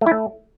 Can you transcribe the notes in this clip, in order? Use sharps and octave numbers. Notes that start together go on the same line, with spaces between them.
A3
E4
A3